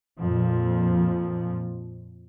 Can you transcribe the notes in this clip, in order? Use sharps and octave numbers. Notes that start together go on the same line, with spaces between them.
F2 A#2 F3